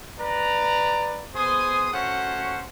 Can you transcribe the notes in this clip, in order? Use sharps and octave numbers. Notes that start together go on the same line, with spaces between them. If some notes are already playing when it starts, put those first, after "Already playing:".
B4 D5 A#5
B3 G#4 C5 G#5 C6 D#6
A3 C#4 F#4 C5 C#5 F#5